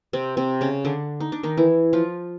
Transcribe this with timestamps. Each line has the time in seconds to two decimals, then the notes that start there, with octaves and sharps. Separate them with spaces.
0.13 C3 C4
0.37 C3 C4
0.61 C#3 C#4
0.85 D3 D4
1.20 D#4
1.32 D4
1.43 D#3 D#4
1.57 E3 E4
1.93 F3 F4